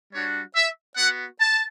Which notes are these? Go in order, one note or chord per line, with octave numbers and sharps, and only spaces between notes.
G3 D4 F#4 C#5
E5
B3 F#4 F#5
A5